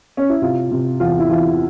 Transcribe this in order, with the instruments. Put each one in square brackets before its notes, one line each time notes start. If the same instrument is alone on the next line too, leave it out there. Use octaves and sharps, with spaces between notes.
[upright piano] C#4
E4
C3 F4
C3
E2 F4
E4
E3 F4